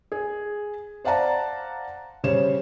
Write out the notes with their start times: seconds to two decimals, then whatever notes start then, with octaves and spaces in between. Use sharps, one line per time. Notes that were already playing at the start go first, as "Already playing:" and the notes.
0.12 G#4
1.05 C5 D5 F5 F#5 A5 A#5
2.24 C#3 G3 C5 C#5 E7